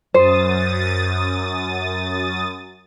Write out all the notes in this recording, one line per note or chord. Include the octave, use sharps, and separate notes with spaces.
F#2 C5 D#6 A6